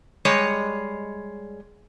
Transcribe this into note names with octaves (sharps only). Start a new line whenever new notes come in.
G3 G#3 C#5 D#5